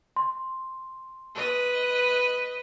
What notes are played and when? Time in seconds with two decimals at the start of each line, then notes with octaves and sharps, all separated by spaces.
0.16 C6
1.35 B4 D#5